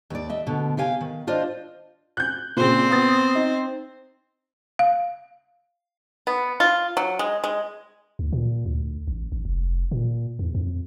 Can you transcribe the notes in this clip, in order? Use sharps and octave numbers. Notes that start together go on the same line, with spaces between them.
D#2 D5
D#5 E5
D2 B2 D3
C3 G4 F5 G#5
D#3
D4 F4 C5 D5 D#5
F#6 G6
A#2 C#3 C4 C5
B3 D#6 A6
D#4
F5
B3
F4
F#3
G#3
G#3
D2
A#2
D2
A1
A1
F1
A#2
E2
F2